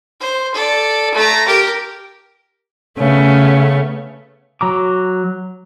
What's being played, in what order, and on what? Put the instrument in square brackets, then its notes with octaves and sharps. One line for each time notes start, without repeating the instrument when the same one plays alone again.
[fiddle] C5
A4 D5
A3 A#5
G4 A#4
[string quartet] C#3 A3 B3 C#4
[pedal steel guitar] F#3 A#5 D6